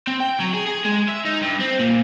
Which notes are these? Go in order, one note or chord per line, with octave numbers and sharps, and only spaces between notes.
C4
G5
F#3
G#4
G#4
G#3
E5
D#4
G2
C4
A#2